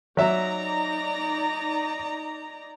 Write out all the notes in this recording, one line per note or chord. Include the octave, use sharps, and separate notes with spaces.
F#3 D#4 D5 E5 A#5